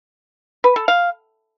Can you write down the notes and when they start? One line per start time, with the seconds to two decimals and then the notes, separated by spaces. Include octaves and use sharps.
0.64 B4
0.76 A4
0.88 F5